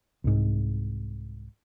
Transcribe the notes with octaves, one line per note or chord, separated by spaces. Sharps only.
C2 G#2